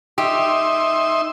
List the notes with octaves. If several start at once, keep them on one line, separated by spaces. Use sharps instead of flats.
D#4 G4 E5 C6